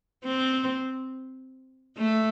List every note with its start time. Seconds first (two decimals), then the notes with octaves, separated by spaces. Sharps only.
0.25 C4
1.98 A3